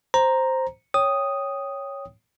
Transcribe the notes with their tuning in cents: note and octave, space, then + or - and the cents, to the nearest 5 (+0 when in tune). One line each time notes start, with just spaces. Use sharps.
C5 +0 A#5 +0
C#5 +0 G5 +0 D#6 +0